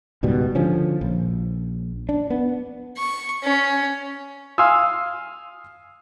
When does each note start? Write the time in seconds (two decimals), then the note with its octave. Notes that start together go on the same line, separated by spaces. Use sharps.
0.23 C#2 G#2 B2 G3
0.55 D3 F3 C#4
1.01 A#1
2.09 D4
2.30 B3
2.97 C#6
3.43 C#4
4.58 F5 G#5 C6 D#6 E6